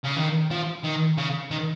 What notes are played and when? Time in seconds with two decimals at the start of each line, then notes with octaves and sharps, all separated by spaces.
0.04 C#3
0.17 D#3
0.51 F3
0.84 D#3
1.17 C#3
1.51 D#3